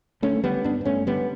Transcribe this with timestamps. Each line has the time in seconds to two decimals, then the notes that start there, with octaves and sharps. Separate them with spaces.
0.22 D3 A3 C#4
0.44 D3 G3 B3
0.64 G2 B3 D4
0.81 B3
0.85 G2 A3 C#4
1.07 D3 G3 B3